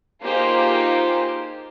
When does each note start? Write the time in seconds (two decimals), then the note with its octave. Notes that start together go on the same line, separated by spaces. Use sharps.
0.23 A#3 D#4 F4 G4 G#4 C5